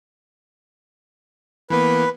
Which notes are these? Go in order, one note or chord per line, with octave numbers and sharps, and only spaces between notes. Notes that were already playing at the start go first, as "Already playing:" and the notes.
E3 A#3 B3 B4